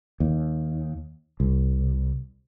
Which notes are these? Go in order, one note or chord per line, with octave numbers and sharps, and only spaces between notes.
D#2
C2